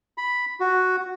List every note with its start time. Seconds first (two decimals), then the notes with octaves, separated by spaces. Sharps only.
0.18 B5
0.60 F#4